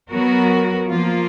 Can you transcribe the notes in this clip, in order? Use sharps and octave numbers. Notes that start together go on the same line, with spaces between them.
F#3 B3 F#4 A#4
F3 A#3 F4